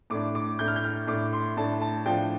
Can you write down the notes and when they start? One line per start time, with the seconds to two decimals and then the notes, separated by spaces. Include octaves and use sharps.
0.10 A2 A3 D4 D6
0.35 D6
0.59 A2 A3 D4 G6
0.68 F6
0.76 G6
0.84 F6
1.07 A2 A3 D4 D6
1.33 C6
1.57 A2 A3 D4 A5
1.81 A5
2.05 A2 F3 D4 G5